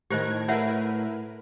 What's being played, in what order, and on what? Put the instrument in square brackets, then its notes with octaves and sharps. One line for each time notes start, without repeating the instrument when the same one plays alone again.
[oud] A2 [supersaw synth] D#3 A#4 G#6 [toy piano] G4 C5 D#5
[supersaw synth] E4 A#4 B4 [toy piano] C#5 E5 F#5